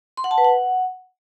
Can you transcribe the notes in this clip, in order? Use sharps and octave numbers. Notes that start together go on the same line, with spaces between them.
C6
F#5
A5
B4
F#5